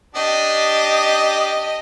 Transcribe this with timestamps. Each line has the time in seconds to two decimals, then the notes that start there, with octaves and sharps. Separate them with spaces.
0.15 D4 G4 D#5 D#6